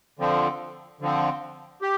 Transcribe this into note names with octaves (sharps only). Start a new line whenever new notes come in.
D3 F3 C4
D3 F3 C4
G4